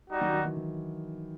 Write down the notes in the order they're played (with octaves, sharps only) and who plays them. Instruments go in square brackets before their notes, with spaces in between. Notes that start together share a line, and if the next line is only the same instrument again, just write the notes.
[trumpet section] G3 D#4 F#4
[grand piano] D#3 F#3
D#3 F#3
E3
E3